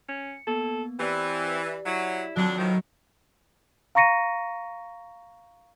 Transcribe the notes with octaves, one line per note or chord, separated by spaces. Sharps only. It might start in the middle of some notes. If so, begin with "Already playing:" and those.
C#4 C#7
A#3 B3 A4
E3 C4 G4 D5
F#3 E4
F2 F#3 D4
A2 D#3 F3
F5 A#5 C#6 A#6 C#7 D#7